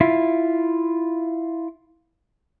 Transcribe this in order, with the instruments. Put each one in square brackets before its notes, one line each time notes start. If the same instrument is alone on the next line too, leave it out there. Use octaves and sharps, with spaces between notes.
[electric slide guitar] E4 F4 E5